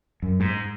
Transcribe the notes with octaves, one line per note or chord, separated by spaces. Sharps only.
F#2
G#2